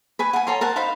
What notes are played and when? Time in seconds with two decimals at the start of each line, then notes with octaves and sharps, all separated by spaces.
0.19 B4 G#5 C#6
0.33 F#5 G#5
0.47 A4 C#5 A#5 C6
0.61 A#4 C5 F#5 A5
0.76 D#4 C5 F5 B5